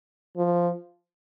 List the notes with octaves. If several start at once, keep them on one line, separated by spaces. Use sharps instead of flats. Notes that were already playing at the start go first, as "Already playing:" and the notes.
F3